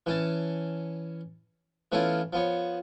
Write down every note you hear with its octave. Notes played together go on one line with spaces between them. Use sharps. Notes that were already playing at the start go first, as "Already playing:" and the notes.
E3 C#4 A5
E3 A3 B3 C#4 E4 F4
F3 B3 C#5